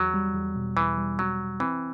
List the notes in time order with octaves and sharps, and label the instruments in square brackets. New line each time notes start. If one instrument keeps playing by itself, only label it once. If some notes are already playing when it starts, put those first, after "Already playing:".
Already playing: [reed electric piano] E2 [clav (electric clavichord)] F#3
[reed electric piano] G3
E2
B2
[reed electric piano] E2 [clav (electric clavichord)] E3
[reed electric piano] G3
[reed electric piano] E2 [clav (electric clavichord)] F#3
[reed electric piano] E2
[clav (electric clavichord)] E3 [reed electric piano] C4